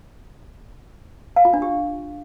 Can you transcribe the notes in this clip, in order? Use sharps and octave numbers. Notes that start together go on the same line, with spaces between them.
F5
F4
D4
G4